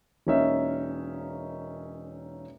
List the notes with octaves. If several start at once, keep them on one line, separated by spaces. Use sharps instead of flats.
E1 A#3 C#4 D#4 E5